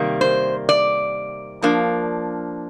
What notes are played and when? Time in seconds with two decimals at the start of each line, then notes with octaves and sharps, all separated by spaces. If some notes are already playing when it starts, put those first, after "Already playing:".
Already playing: C3 D#3 G3 A#3
0.21 C5
0.69 D5
1.62 F3 A#3 D4